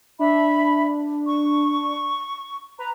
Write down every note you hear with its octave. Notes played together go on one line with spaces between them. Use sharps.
D4 E5 B5
C#6
B4 A#5